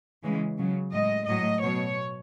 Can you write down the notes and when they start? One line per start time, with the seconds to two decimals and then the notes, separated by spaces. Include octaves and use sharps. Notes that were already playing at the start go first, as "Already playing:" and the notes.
0.23 C#3 E3 G#3
0.58 C#3 F#3
0.92 A2 G#3 D#5
1.27 A2 F#3 D#5
1.62 B2 F#3 C#5